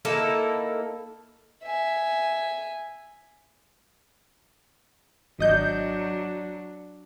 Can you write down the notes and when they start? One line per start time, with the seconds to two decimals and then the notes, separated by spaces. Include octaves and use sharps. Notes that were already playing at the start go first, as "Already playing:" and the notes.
0.05 A#3 D#4 E4 A4
1.63 E5 G#5
5.39 G#1 F#3 D4 D#5 G6